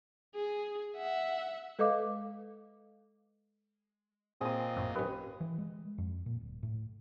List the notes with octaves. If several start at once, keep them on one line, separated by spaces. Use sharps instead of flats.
G#4
E5 F#5
G#3 A4 B4 D#5 F5 D6
A#2 C4 G#4 D#5 D#6
A1 F#2 A2
D#2 F#3 C#4 B4
E3
G#3
F2
A#2
D1
A2